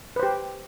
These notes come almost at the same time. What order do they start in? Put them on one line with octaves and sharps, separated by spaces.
B4 C5 G4